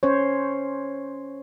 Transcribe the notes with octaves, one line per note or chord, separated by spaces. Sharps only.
C#4 C5 C#5